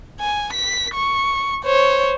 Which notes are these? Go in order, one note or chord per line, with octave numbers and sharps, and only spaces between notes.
G#5
B6
C#6
C5 C#5